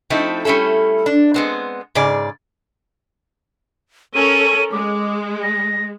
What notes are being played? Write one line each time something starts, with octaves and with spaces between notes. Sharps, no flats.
F3 A3 C4 D#4 E4
G3 A3 C#4 E4 A4
D4
G#3 B3 C4
G#2 C#3 G#4 D5
C#4 A4 A#4 D#7
G#3 D6
A#6